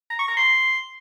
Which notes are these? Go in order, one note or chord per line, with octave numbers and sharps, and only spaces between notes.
A#5
C#6
A#5
C6